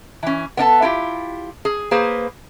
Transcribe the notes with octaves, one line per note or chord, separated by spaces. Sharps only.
E3 C#4
B3 D4 A4 A5
E4 F4 G4
G#4
A#3 G#4 B4 C5